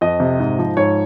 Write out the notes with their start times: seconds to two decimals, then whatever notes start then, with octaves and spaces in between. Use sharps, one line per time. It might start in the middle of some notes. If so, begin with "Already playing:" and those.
0.01 F2 D#5
0.20 C3
0.39 G#2
0.58 F3
0.77 G#2 C#5